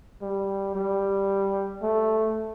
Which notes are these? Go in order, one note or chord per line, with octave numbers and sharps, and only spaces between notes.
G3
G3
A3